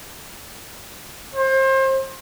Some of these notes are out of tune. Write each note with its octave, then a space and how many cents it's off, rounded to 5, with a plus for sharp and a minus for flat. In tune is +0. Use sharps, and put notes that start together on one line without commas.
C5 +30